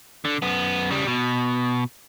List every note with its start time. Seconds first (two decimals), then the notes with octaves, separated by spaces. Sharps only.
0.25 D3
0.42 F#2 B3
0.91 C#3 G3
1.07 B2